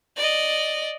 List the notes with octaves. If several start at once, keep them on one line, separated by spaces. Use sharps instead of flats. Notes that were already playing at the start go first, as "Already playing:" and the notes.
D5 D#5